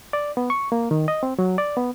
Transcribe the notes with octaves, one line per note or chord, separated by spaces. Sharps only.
D5
B3
C#6
A#3
D#3
D#5
C4
F#3
D5
B3